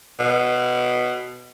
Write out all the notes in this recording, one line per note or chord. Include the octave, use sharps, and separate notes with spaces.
B2